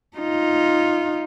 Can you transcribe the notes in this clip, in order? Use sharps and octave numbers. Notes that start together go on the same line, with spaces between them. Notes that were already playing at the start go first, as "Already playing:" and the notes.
D#4 F4